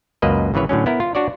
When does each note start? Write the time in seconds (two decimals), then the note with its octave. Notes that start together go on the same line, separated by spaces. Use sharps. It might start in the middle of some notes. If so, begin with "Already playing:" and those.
0.22 C#2 F#2 A#3 B4 D#5
0.54 G#1 C#3 E3 B4 C#5
0.69 A2 D3 F#3 C#4
0.86 B3 E4 A#4
1.00 F4
1.15 D4 F#4 C#5 D5